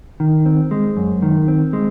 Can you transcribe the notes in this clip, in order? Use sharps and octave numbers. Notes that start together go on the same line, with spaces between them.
D#3
C4
G#3
F#2
D#3
C4
G#3